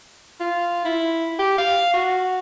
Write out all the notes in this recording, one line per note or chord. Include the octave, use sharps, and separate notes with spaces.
F4
E4
G4
F5
F#4